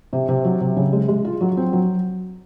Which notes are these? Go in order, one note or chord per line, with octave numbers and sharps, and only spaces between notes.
C3
C3
F#3
C3
C#3
G#3
G#3
F4
F#3
C4
F#3